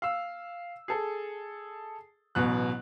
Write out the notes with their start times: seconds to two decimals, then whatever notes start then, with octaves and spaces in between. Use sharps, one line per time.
0.02 F5 E6
0.88 G#4 A4
2.35 A1 B2 F#3 F#6